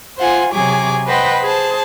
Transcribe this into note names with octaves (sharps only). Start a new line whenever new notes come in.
F4 C5 F#5 G#5
C3 F#3 G#4 C#5 G#5 D6
B4 C5 D#5 F#5 G5 B5
G#4 C5 A5